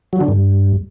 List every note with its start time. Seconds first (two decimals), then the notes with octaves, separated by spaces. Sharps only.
0.13 F#3
0.21 D3
0.28 G2